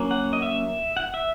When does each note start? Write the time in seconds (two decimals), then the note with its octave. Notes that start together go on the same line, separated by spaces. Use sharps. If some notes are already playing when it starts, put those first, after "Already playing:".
Already playing: F#3 A#3 C#4
0.11 F#5
0.33 D#5
0.42 E5
0.97 F#5
1.14 E5